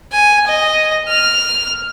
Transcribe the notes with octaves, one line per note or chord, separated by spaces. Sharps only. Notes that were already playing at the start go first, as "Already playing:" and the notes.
G#5
D#5
F6